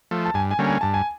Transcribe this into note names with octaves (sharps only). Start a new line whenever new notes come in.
F3 A3
A5
G2 G#5
G#5
D3 G3 A#3 C#4
G#5
G2 A5
G#5